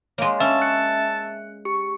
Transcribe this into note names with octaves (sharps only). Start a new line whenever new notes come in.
G#3 A#3 C#5 F5
C#4 E5 A5
F#6 C#7
G4 C#6